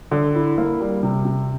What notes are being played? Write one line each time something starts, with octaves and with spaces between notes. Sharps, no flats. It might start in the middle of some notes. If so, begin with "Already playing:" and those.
D3
E4
A#3
G3
C3
C3